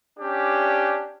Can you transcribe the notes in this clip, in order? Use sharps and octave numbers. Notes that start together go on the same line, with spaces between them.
C#4 D4 G4